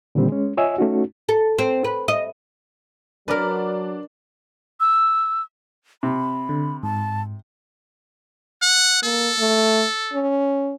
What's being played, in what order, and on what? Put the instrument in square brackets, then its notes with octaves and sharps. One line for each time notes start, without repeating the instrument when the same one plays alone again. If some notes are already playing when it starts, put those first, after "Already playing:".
[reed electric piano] A#2 D3 D#3 G3 C4
G#3 C#4
F4 C#5 D#5 E5 G#5 E6
A3 C#4 D#4 F#4
[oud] A4
C4
B4
D#5
[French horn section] F#3 [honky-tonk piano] D4 D5 [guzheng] A#4 B4
[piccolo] E6
[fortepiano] C3 [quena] B5
[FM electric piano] D3
[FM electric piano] G#2 [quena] A5
[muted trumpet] F#5
[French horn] A#3 [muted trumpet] A4
[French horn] A3
C#4